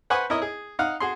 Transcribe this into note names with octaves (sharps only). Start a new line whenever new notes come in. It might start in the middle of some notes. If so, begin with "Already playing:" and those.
B4 C5 F#5 G#5 B5 C#6
E4 A#4 C#5 D#5
G#4
D#4 F5 F#5
F#4 G#4 C6